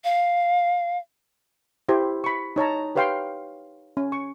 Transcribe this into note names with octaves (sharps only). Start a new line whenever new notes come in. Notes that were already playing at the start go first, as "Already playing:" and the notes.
F5
E4 G4 C5
B5 C#6
D#4 C#5 A5 A#5
G4 B4 C#5 F5 G5 C6
C#4
C#6